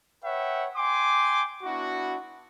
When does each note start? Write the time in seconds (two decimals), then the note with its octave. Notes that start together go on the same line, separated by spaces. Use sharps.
0.23 B4 C#5 E5 F#5 G5
0.75 G5 G#5 C6 D6
1.63 B3 D4 E4 F#4